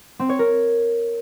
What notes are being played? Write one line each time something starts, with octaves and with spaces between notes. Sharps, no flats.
C4
C#5
A#4